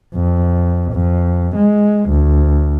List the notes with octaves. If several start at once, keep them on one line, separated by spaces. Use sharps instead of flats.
F2
F2
G#3
D2